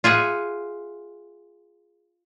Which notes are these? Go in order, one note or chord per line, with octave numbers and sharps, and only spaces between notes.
F4 G#4 E5 F#5